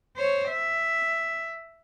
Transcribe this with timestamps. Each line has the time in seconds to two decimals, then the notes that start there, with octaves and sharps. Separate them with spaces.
0.17 C5 C#5
0.49 E5